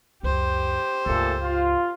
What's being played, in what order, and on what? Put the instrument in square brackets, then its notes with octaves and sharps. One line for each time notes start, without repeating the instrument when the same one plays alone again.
[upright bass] C#2 F#2 [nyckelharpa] G4 C5
[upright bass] C#2 G2 [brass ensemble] A#2 A3 A4
[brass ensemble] F4